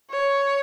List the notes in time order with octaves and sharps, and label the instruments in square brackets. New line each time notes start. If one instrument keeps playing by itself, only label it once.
[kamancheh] C#5